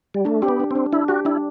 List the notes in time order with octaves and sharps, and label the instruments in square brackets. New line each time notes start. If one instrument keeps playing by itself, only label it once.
[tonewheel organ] G3
[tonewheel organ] A3 [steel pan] D4
[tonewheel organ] C4 [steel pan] G4
[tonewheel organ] B3
[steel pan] D4
[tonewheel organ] C4 [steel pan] D4
[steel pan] D4 [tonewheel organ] E4
[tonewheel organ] F#4 [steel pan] G4
[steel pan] D4 [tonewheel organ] E4